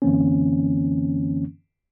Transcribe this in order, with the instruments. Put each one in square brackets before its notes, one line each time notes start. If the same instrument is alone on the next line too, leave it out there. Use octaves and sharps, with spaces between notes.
[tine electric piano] F#2 D3 E3 A#3 C4 C#4